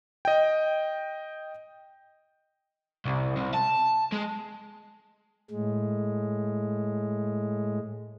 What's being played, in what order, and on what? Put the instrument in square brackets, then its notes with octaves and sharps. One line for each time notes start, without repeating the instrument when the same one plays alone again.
[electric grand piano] D#5 G5
[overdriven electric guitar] C2
C2
A5
G#3
[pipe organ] A2 G#3